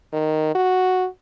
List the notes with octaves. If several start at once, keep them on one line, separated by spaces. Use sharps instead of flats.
D#3
F#4